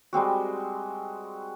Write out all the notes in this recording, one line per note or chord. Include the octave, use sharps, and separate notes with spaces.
G3 G#3 C4 F#4